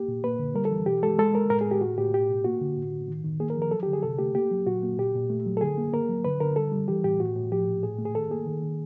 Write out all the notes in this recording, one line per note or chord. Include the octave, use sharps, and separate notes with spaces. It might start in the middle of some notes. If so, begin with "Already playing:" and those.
Already playing: A#3 G4
A#2
A#3 B4
D3
G3 A#4
A4
E3
B2 G4
G#3 A4
G#3 A4
G#3 A#4
A2 A#4
G#4
A2
G4
A2 F#4
A2 G4
B2 G4
B2
A#3 F#4
D3
A2
A2
D#3
D#3
A#3 G#4
A#4
F3
A#4
F#3 A4
G4
D3
G#4
C3 A4
A3 G4
A#3 G4
F#3
A#2 F#4
A#3
A#2 G4
A#2
A3
F#3
A4
D3 G#4
A#3
A#3 A#4
F#3
D3 B4
D3 A#4
G3 A4
G3
E3 G4
A2 G4
A2 F#4
A2
F3 G4
A#2
A2 G#4
A3
G#4
D#3 A4
A#3 G#4
D#3
D#3